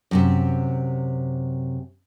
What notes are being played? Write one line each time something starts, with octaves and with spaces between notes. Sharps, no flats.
F#2 A2 C3